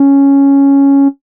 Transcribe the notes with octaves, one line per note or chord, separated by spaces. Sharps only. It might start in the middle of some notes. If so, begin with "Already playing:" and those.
Already playing: C#4